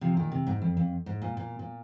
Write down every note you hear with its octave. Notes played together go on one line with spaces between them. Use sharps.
C3 F3
A#2 D#3
C3
G#2
F2
F2
G#2
A#2
A#2
A#2